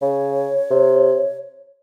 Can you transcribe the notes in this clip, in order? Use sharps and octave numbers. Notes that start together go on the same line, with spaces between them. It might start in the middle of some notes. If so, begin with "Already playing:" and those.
C#3 C#5
C3